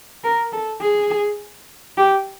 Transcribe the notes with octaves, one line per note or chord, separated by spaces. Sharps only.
A#4
A4
G#4
G4